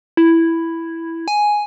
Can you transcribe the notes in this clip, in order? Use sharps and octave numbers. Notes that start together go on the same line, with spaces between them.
E4
G#5